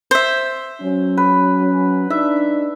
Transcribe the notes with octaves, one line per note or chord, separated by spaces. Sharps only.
C5 E5
F#3 C#4
B4
D4 D#4 E5